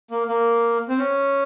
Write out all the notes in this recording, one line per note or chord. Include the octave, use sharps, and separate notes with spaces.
A#3
A#3
C4
C#4